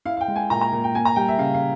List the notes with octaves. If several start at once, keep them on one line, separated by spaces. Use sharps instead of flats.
E4 F5
F5
G5
G#3
G#5
A#2 A#5
A#5
A#2
G5
A#3 G#5
A#5
G3 G5
E5
C#3 F5
F5